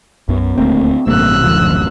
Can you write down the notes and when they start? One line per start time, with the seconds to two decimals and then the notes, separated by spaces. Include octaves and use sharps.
0.29 B1 F#2 B3
0.58 D#1 D2 A3 A#3 C4
1.07 A1 G2 C3 A3 A#3 E6 F#6
1.42 D1 A1 F#2 A#2 D3 F3